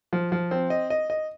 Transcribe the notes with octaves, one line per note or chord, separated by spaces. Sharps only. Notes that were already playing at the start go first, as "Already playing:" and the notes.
F3
F3
C4
D#5
D#5
D#5